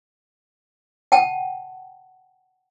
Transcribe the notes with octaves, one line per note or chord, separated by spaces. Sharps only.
F#5 G5 A5